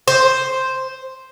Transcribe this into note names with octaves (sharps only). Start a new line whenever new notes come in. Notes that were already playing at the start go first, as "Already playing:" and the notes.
C5